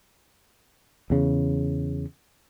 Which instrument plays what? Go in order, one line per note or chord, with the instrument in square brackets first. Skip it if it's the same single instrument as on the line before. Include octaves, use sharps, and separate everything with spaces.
[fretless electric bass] E2 C#3